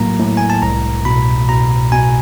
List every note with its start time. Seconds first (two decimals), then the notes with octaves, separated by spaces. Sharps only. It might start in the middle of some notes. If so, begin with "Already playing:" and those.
Already playing: A2 F#3 A#3 A#5
0.19 A2
0.37 G#5
0.50 A5
0.62 C2 A#5
1.05 B2 B5
1.49 B2 A#5
1.92 B2 G#5